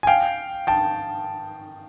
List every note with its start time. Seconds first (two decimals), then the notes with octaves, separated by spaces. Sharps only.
0.03 G#5
0.07 F5 G5
0.67 G5 A5